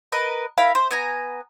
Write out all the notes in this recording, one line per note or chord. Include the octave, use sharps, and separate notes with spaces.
A#4 B4 D#5
E4 A#4 F5 B5
C5
B3 G#5 A#5